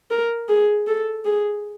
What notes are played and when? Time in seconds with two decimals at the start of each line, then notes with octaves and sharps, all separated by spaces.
0.11 A#4
0.49 G#4
0.87 A4
1.25 G#4